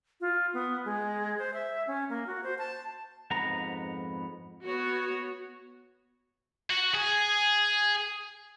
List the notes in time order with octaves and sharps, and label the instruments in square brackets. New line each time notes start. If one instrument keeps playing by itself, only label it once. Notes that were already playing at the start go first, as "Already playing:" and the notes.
[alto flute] F4
B3
G#3
C5
E5
C#4
A#3
F#4
C5
A5
[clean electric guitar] F2 G#2 B3 A#5
[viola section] B3 F#4 C#5
[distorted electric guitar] F#4
G#4